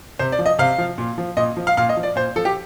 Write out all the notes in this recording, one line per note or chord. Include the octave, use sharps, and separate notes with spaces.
C3 C5
D5
F3
D#5
C3 F5
F3
A#2
F3
A#2 D#5
F3
F5
A#2 F5
D#5
F3
D5
A#2 C5
F3 A4
G4